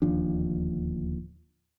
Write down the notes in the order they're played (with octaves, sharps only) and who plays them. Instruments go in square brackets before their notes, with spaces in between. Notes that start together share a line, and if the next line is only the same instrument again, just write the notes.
[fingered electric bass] D1 D#2 F3 D4